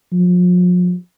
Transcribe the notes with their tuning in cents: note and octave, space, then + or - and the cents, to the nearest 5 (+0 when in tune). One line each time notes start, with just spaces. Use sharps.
F3 +40